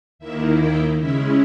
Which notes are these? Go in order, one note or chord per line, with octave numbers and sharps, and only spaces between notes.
D#2 D#3 A#3 E4 E5
G5
C#3 G#3 C#4 E4 E5